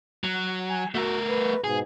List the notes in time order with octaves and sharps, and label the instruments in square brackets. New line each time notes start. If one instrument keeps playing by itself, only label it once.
[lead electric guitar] F#3
[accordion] G#5
[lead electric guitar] A3 A#4 [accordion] F#4 F#5
[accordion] B4
[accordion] G#2 B2 [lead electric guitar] G#4